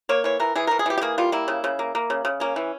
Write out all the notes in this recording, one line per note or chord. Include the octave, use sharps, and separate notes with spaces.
A#3 C#5
E3 C#5
E3 A#4
E3 G#4
E3 A#4
G#4
E3 G4
G4
A#3 G#4
G3 F4
A#3 E4
C#3
C#3
A#3
A#3
C#3
C#3
A#3 C#4
E3